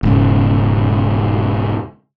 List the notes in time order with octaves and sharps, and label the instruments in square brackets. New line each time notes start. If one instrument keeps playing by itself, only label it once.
[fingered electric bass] E1 G#2 C#3